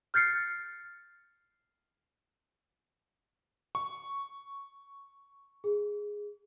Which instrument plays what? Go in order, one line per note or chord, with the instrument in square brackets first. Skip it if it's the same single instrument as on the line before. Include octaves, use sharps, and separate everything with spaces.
[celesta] F6 G6 A6 C7 C#7
[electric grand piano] C#6
[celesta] G#4